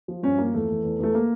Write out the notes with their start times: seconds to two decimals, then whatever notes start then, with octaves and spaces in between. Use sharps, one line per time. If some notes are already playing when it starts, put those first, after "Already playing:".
0.08 F3
0.23 G2 C#4
0.38 F3 A#3
0.53 E2 A3
0.69 E2
0.83 E2
0.99 E2 A3
1.14 A#3